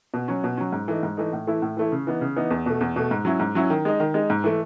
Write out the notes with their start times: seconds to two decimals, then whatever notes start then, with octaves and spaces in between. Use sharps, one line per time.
0.14 B2
0.28 F#3 C#4
0.44 B2
0.57 F#3 C#4
0.73 G#2
0.88 E3 A3 D#4
1.03 G#2
1.17 E3 A3 D#4
1.33 A2
1.47 E3 A3 E4
1.62 A2
1.77 E3 A3 E4
1.92 C#3
2.07 E3 B3 D#4
2.21 C#3
2.36 E3 B3 D#4
2.51 E2
2.66 B2 A3
2.81 E2
2.96 B2 A3
3.11 G#2
3.25 F#3 C#4 E4
3.40 G#2
3.55 F#3 C#4 E4
3.70 D#3
3.85 G#3 D#4
4.00 D#3
4.14 G#3 D#4
4.30 G#2
4.44 E3 A3